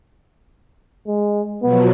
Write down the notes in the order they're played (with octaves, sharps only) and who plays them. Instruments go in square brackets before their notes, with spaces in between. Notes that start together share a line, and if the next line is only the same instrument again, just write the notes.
[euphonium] G#3
[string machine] B2 F3 F#3 [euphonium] B3